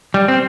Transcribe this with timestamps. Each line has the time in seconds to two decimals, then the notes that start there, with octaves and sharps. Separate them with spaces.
0.14 G3
0.28 C4